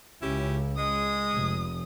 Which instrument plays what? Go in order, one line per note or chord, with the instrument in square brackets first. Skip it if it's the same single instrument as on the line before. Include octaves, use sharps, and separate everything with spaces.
[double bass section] C#2 C#3 [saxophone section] C#4 E4 G4
[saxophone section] G#3 [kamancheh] D#6
[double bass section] F1